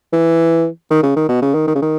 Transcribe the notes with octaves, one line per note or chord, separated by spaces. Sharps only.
E3
D#3
C#3
D#3
B2
C#3
D#3
D#3
C#3
D#3